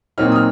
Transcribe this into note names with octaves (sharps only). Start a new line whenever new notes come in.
A#2 F#3 C4 D#4 F6
D#6
F6